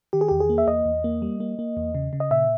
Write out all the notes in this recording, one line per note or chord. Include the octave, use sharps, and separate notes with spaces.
D#3 G4
G#4
E2 G4
G#4
A#3
E5
E2 D#5
E2
A#3
G3
A#3
A#3
E2
C#3
C#3
D#5
A#2 E5